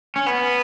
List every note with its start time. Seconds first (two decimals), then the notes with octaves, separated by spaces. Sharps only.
0.16 C#4
0.26 B3